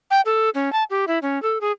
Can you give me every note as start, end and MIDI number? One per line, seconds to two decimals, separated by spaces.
0.10 0.21 79
0.25 0.50 69
0.54 0.72 61
0.72 0.83 81
0.90 1.05 67
1.07 1.19 64
1.22 1.41 61
1.42 1.58 69
1.61 1.72 68